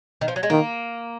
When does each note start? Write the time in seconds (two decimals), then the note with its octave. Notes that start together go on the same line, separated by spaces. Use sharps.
0.21 D#3
0.28 F3
0.36 F#3
0.43 G#3
0.50 D#3 A#3